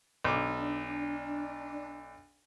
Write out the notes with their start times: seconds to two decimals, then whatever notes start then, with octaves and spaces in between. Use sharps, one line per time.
0.24 B1 D4 D6